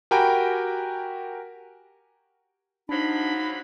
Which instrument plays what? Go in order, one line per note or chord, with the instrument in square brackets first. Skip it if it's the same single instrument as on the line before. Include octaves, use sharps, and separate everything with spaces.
[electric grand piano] F#4 G4 A#4 G5 G#5 B5
[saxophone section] D3 F3 F#3 [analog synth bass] D4 [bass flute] D#4 [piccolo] B5